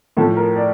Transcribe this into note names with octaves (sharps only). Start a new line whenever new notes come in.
A2 F3 A4
A#4
D5